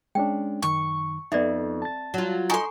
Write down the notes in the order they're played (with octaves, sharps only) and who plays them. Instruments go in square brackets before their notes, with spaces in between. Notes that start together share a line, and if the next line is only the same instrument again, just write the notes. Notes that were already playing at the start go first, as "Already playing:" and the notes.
[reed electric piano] G#3 C#4 D4 [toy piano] G5
[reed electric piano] F#2 D#3 [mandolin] C#6
[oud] F2 [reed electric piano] B3 D#4 [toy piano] D5 E5
[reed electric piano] A5 A6
[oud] F#3 F4
[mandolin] D#4 C6 [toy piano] A4 G#5 A#5 [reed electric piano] C#6